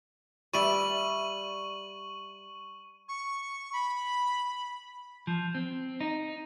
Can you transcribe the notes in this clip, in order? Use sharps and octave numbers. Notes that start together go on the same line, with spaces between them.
G3 D5 E5 C#6 D#7 F#7
C#6
B5
F3
C4
D#4